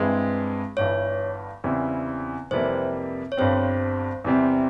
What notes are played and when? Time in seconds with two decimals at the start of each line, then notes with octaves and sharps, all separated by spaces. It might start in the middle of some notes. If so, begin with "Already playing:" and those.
Already playing: G2 E3 G#3 C4
0.77 G1 G2 E3 C#5
1.64 E2 C#3 G3 C4 E4
2.51 F2 C3 E3 G3 A#3 C5
3.32 C#5
3.37 G1 G2 G3 C4 C5
4.24 E2 C3 G3 C4